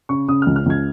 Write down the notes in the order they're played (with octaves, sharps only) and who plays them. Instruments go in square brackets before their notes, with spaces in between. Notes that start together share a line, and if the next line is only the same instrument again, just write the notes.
[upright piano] C#3 C#6
C#3 D#6
C#2 F6
F6
C#2 G#6